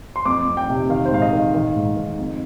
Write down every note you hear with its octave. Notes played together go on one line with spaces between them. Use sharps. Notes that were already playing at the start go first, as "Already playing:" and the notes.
C6
F2 D6
F2
G5
C3
D#3 F5
C5
G#2 F5
D#5
D#3
F5
D#3 F5
G#2
D#3
F2